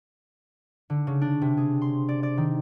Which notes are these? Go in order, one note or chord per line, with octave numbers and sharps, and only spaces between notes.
D3
C#3
D4
C3
G#4
C6
D5
D5
D#3